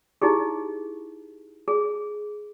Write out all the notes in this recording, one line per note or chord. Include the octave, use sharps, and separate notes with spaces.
D#4 E4 G4 G#4
G#4